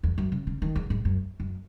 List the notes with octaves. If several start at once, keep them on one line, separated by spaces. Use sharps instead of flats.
E2
F#2
C#3
C#3
D#3
E2
G#2
F#2
F#2